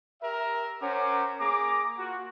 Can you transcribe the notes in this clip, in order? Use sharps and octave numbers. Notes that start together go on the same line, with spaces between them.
G4 A#4 E5
C#4 A#4 C5 F#5 D6
A#3 G#4 A#5 D6
A#3 F4 F#4